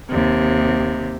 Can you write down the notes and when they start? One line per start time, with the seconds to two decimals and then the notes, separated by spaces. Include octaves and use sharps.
0.10 D#2 C3